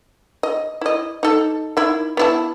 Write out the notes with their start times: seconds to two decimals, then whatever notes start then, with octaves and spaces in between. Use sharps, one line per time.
0.43 D#5
0.81 E4 D#5
1.23 D#4 A4
1.77 D#3 E4
2.17 B3 E4 A5